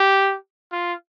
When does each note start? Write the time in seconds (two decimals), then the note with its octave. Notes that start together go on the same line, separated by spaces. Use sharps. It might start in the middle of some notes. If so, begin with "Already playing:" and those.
Already playing: G4
0.72 F4